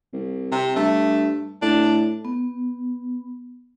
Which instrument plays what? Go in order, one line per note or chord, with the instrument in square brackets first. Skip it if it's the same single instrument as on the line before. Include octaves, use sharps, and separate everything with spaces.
[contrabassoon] C2
[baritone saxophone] C3
[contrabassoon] G2 [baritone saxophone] A3
[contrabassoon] A2 [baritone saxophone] D4
[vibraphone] B3